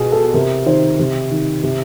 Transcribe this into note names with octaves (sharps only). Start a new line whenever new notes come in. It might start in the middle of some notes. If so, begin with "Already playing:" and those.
Already playing: B2 G#4
A4
C3 A#4
D#3 C5
C3
D#3
C3